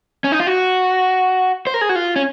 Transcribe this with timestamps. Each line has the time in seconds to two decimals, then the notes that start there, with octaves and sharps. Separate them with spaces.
0.24 C#4
0.32 D#4
0.40 F4
0.47 F#4
1.67 C5
1.74 A#4
1.81 G#4
1.89 F#4
1.96 F4
2.16 C#4